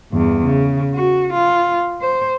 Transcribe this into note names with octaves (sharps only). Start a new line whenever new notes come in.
E2 G2
C#3
F#4
F4
C5